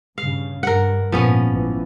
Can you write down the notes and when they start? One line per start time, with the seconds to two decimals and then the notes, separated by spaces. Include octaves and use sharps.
0.18 G2 C#3 F5
0.63 G2 A#4 F#5
1.12 G#1 G2 A#2 F3 B3 C#4
1.48 A1 E3